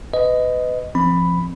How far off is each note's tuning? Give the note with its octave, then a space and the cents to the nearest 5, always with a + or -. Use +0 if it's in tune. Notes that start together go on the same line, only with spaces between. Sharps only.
B4 +25 D#5 +0
F3 -25 C4 +0 B5 +5